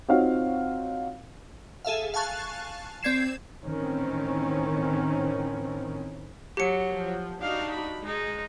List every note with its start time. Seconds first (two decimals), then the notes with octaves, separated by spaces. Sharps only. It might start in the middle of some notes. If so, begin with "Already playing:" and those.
0.08 C4 D#4 F4 F#4 C#5 F5
1.85 G#4 A4 E5 F5
2.14 F5 G#5 A5 C#6 F#6 A6
3.03 C4 D5 G#6 C7 E7
3.65 A2 D#3 E3 C4 C#4
6.57 F#3 G4 C#7
6.92 F3
7.41 D4 D#4 F#4 F5
7.70 B5
8.05 G#3 D#4